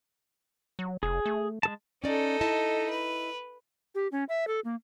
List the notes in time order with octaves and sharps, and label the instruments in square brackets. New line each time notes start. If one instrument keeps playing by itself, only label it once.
[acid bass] F#3
[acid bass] F1 [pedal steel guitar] G#4
[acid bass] A3
[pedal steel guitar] G#3 A4 A5
[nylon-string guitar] C#4 D5 [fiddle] D#4 A4
[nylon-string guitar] E4 D#5 A5
[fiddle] B4
[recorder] G4
C#4
E5
A4
A#3